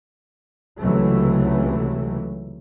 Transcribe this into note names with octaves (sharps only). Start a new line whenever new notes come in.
C#2 C3 E3 F#3 A3